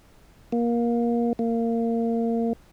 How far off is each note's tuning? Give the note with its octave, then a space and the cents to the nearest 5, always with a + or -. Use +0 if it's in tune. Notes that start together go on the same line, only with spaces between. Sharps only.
A#3 +20
A#3 -20